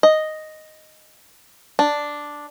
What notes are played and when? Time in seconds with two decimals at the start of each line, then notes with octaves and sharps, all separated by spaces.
0.03 D#5
1.79 D4